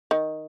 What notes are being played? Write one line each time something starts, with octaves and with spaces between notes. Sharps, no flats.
D#3